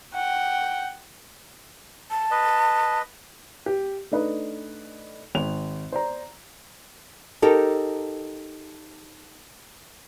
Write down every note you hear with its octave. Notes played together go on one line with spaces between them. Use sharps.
F#5 G5
A5
B4 D#5
G4
A3 D4 D#4 B4
G#1 F7
C5 D5 A#5
D#4 G4 A4 A#4